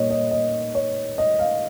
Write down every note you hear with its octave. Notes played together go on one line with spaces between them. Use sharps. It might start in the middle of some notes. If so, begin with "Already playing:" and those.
Already playing: A#2 G3 A#3 D#4 C#5 D#5
D#5
D#5
C#5
D#5
F5